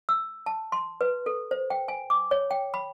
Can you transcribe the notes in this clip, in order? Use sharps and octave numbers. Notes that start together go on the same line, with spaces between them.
E6
A5
C6
B4
A4
C5
G5
G#5
D6
C#5
G5
B5